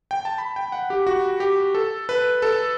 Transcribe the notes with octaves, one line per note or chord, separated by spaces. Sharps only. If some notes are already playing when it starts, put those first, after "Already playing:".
G5
A5
B5
G5
F#5
G4
F#4
G4
A4
B4
A4